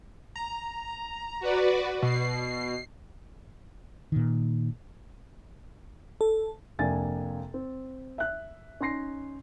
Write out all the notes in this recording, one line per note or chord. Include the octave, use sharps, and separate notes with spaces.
A#5
F#4 B4 D5
B2 C7
A#2 D#3
A4
F2 C3 A#3 D4 G#5 A6
C4
E5 F#6
C#4 D#4 C6 A#6 C7